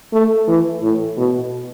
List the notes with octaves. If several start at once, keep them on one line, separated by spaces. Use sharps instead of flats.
A3
E3
A2
B2